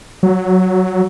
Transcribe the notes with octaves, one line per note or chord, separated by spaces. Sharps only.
F#3